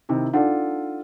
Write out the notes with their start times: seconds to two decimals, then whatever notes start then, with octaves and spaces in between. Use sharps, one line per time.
0.09 C3 D#3 E4
0.33 D4 D#4 F4 A4 D5 F#5